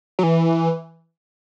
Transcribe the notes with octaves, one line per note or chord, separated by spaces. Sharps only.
F#3
E3